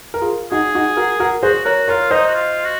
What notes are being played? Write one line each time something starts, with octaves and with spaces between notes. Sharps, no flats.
A#4
F4 G#4
D#4 F#4 G#4
D#4 F#4
F#4 A#4
F#4 A#4
F#4 G#4 C5
F#4 A#4 C#5
F4 A#4 C#5
D#4 C5 D#5
F#4
F4
F#4